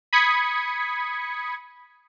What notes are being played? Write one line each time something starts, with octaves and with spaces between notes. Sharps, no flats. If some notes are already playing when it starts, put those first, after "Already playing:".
B5 D#6 G#6 B6 C#7